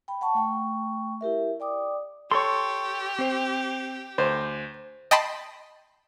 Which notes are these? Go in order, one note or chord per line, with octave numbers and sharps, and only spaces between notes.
G5 B5
F#5 A5 C#6
A3 G5 C#6
E4 G4 A#4 E5
D5 G5 D6 D#6
G4 A4 C#5 C6 C#6
C4 C5
D2 C5
D#5 G5 A5 B5 C6